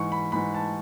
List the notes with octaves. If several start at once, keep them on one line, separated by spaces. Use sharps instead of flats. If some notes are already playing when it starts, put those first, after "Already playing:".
Already playing: G#2 E3 C#6
B5
G#2 E3 B5
A5